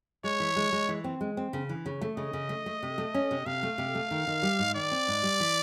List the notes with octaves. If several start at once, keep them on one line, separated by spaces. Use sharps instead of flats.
G#3 C#5
E3
G#3
G#3
E3
C4
G#3
C4
C#3
E3
C#3
A3
C#3 D#5
C#3
A3
A3
C3
A3
C#4
C3
C3 F5
A3
C3
A3
D#3
D#3
G3
G#2
D#3 D5
C4
G#2
G3
E3